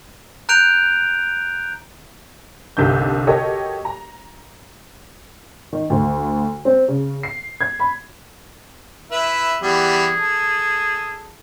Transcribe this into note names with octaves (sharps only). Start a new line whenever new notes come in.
A#5 F#6 G6 D7 F7
G1 C2 D3 D#3 G6
F#4 G4 A4 A#4 C#5 D#5
A#5
D#3
D2
C4
C#3
C7
G#6
B5
E4 B4 E5
E3 G3 B3 G#4
A4